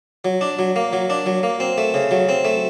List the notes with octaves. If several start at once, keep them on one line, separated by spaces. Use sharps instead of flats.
F#3
D4
F#3
A#3
F#3
D4
F#3
A#3
C4
A3
C#3
F#3
C4
A3